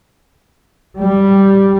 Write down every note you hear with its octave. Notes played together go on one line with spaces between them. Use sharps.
G3